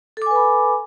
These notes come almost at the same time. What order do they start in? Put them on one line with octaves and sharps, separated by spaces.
A4 D6 G#5 B4 B5